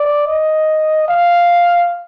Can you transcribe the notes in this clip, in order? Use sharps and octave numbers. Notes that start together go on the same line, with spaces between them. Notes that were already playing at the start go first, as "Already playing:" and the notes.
Already playing: D5
D#5
F5